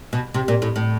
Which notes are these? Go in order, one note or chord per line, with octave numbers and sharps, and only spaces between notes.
B2
C3
A#2
A2
A2